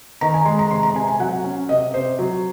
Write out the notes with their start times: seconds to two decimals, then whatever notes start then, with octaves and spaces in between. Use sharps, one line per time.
0.21 D#3 A#5
0.34 G#5
0.46 G#3 C6
0.59 A#5
0.71 C3 C6
0.83 A#5
0.95 C3 G#5
1.07 G#5
1.19 F#3 F#5
1.44 C#4
1.69 C3 D#5
1.94 C3 C5
2.19 F#3